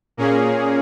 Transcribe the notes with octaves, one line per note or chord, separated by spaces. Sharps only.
A#2 A#3 C#4 G#4